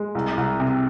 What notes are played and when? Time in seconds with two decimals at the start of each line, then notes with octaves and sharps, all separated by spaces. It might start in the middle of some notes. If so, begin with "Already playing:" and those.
Already playing: G#3
0.15 C2
0.37 C2
0.60 C3